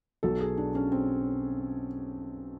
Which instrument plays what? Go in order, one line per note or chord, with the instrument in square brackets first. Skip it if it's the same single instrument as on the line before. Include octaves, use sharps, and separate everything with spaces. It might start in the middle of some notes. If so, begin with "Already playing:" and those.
[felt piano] B1 B2 F#3 A4
G#4
D4
C#4
C4